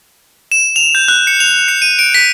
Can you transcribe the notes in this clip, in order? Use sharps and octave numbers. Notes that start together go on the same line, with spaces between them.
E7
F7
G6
F#6
C#7
F7
C#7
D#7
D7
B6